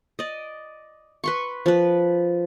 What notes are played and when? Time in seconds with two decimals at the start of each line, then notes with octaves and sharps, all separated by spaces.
0.19 D5 D#5
1.24 B4 C6 C#6
1.66 F3 B4